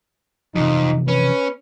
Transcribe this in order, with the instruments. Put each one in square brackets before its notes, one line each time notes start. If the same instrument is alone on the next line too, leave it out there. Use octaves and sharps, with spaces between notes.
[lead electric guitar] F2 [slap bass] C3 E3 F3 [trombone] D#4
[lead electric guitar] C#4 [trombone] B4